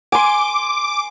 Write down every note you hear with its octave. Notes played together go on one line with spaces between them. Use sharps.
G#5 C6 D6